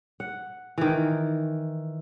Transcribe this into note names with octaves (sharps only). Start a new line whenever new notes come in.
F#5
D#3 E3